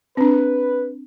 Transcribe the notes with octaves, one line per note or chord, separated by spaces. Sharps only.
C4 D4 B4